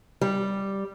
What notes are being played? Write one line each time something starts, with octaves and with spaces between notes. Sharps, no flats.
G3